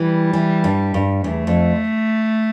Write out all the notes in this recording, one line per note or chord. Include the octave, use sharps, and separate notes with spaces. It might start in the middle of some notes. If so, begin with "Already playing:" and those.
Already playing: E3 G3
E3
G2
G2
E2 A3
F2